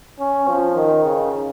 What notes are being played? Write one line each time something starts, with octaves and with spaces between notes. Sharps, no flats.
C#4
F3
D#3
C#3